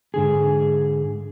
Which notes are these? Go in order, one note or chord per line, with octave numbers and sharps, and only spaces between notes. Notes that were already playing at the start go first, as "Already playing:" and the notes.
G#2 D3 G#4